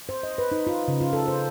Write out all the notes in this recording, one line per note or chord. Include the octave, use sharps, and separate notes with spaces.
C5
D#5
B4
D#4
F4
C#3
F4
A4
C5